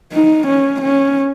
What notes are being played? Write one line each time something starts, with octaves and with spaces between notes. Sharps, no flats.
D#4
C#4
C#4